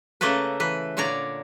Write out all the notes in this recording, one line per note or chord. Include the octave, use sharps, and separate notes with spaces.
C#3 A3 A#3 A4 B4
E3 B4
A#2 D3 C#5 D5 A#5